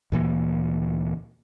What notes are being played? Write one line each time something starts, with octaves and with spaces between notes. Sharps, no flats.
D2 A#2 E3 A#3